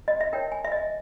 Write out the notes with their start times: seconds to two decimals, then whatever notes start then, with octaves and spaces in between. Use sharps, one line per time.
0.08 D#5
0.21 E5
0.33 D#4 A#4 C#5 G5
0.52 G#5
0.64 E5
0.72 D#5